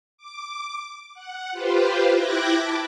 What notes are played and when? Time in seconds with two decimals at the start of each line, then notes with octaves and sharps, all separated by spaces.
0.18 D6
1.14 F#5
1.52 F4 G4 B4 C5
2.13 E4 G5 D6 F#6 G#6 A#6
2.54 A5 B5 D6